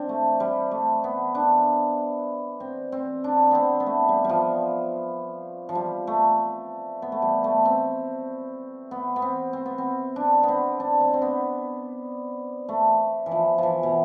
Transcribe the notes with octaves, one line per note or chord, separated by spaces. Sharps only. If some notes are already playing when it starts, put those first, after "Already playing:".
Already playing: C4 D4
A3
G3
A3
B3
D4
C4
C4
D4
B3 C4
B3
A3
G3
G3
F3
F3
G3
A3
B3
A3
G3
A3
C4
B3
B3
C4
C4
B3
C4
D4
B3
C4
D4
C4
C4
B3
A3
E3
F3
E3 F3
B2